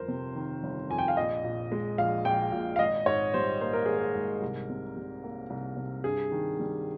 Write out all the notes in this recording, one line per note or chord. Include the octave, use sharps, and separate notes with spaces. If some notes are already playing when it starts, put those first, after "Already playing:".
Already playing: G1 F2 A#4 C5
C3
D#3
G1
F2 G#5
G5
F5
A#1 D#5
A#2
G#3
A#1 F5
A#1 G5
A#2
F5
G#1 D#5
G#2 C#5
G3 C5
A#3 C5
A#4
G#1 G#4
A#4
G#2
C2
C3
G3
A#3
C2
C3
G2 G#4
D#3
G3